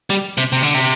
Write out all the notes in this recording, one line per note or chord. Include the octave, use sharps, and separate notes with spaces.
G3
C3
C3
D3
C3